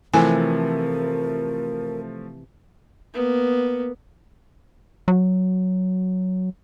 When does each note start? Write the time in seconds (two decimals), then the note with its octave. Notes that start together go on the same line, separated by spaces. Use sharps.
0.14 C3 E3 F3 A3 A#4 G#5
3.14 A#3 B3
5.08 F#3